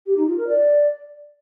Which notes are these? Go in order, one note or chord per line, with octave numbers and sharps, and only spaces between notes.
G4
D#4
F4
A#4
D5